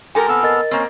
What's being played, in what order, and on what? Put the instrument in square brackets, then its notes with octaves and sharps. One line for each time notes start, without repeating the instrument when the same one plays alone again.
[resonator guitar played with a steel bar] G#3 A4 A#4 [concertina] G4 [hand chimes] G#5
[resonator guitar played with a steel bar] A#2 C4 [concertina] B3 A4 F6
[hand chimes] A#4 D#5 A6
[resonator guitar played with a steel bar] A#3 C4 [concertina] C#4